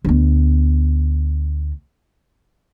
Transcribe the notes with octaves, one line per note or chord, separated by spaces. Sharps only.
D2 B3